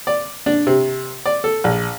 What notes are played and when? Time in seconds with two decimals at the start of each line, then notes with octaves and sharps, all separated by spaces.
0.07 D5
0.46 D4
0.67 C3
1.26 D5
1.44 A4
1.64 A#1